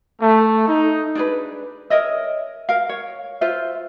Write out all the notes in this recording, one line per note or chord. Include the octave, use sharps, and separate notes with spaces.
A3
D#4
D4 G#4 B4
A#4 C#5 D#5 E5
A#4 F5
C#5
F4 C5 E5